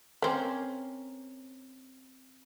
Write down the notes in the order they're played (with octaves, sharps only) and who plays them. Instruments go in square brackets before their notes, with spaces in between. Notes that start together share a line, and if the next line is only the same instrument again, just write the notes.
[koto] A#3 C4 C#4 [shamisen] B4 C5